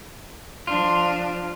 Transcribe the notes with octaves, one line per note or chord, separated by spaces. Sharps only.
F3 D4 F4